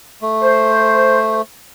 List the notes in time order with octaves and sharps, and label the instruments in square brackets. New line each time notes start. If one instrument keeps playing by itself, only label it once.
[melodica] A3
[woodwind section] C5